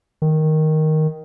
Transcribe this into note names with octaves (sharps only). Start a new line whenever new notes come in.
D#3